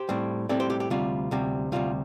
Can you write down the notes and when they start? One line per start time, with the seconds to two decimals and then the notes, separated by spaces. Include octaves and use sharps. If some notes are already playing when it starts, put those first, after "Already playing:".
Already playing: G4 C5
0.09 A2 G3 C4
0.49 A2 G3 C4 A4 D5
0.60 G4 C5
0.70 G4
0.80 G4
0.90 D2 C3 G3 F4
1.31 D2 C3 G3
1.72 D2 C3 G3 F4